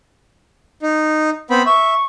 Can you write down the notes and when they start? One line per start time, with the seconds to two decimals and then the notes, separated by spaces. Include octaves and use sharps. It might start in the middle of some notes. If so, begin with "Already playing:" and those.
0.82 D#4
1.50 B3 C4 B5
1.66 E5 C#6